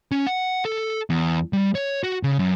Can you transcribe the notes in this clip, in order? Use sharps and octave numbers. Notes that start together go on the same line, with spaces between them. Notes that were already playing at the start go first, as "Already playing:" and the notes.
C#4
F#5
A4
E2
G3
C#5
F#4
C#3
F#2